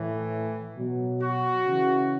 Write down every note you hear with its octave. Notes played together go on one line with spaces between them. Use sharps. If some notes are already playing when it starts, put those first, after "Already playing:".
Already playing: A2 E3
B2 F#3
F#4
C#3 E3